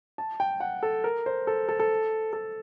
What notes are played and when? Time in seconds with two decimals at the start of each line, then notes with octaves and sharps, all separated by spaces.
0.18 A5
0.40 G5
0.60 F#5
0.83 A4
1.04 A#4
1.26 C5
1.47 A4
1.69 A4
1.79 A4
2.33 A4